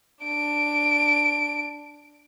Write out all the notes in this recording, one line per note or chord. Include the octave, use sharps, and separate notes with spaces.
D4 D7